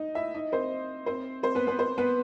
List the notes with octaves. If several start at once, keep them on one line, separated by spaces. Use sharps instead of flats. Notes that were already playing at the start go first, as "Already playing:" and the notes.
Already playing: D#4 D#5
E4 E5
D#4 D#5
C4 C5
C4 C5
C4 C5
B3 B4
B3 B4
C4 C5
B3 B4